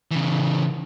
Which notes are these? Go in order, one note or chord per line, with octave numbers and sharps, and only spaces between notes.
C#3 E3